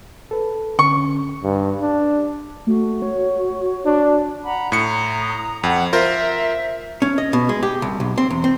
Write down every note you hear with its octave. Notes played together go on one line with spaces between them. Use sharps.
A4 B4
D3 C#4 C#6
G2
D4
A3 F#4
C#5
D4
F#5 A#5 B5
A2 A#5 D#6 C#7
F2 F#5 G5
F4 A#4 C5 E5
C#4
D#5
B2
G#3
G4
C2
B1
C4
E2
C4